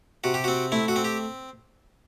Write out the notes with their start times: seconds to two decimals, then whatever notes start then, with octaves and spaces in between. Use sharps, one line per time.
0.24 C3 F#4
0.34 G4
0.44 C4 F#4
0.72 A3 E4
0.88 F#4
0.96 C4
1.04 G4